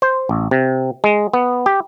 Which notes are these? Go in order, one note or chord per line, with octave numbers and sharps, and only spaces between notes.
C5
A1
C3
G#3
B3
G4